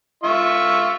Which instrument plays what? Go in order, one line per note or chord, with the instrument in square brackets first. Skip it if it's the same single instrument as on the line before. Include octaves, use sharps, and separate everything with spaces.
[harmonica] F4 E5 C#6